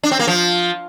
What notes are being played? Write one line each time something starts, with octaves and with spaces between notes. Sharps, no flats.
D4
C4
A#3
F3